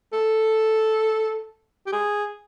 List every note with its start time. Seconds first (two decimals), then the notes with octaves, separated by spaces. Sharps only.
0.13 A4
1.86 G4
1.92 G#4